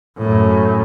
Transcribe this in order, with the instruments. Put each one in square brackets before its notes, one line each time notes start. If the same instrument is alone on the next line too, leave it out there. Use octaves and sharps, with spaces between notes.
[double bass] F#2 A2